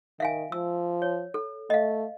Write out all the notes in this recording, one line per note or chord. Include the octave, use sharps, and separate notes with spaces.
D#3 E5 F5 G#5
F3 E6
C#5
A4
A3 D#5 F5